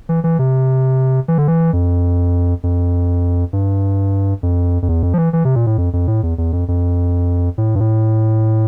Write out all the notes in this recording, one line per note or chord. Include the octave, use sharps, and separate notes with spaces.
E3
E3
C3
E3
D3
E3
F2
F2
G2
F2
F2
E2
F2
F3
E3
E3
C3
A#2
A2
F2
F2
A2
E2
E2
F2
F2
A2
G2
A2